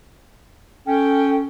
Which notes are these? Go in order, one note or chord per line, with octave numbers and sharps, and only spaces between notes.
C#4 A4 G5